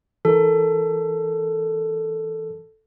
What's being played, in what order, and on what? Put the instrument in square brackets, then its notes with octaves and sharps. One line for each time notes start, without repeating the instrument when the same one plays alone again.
[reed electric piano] E3 A#4 [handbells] A4